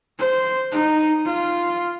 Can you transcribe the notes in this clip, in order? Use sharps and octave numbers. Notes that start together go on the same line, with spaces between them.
C5
D#4
F4